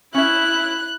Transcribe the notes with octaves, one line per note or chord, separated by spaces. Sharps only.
C#4 E4 E5 F#6